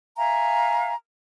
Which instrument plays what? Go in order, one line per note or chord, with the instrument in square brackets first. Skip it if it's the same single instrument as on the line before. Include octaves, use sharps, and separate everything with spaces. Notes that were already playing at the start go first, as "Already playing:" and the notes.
[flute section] E5 F5 G#5 A#5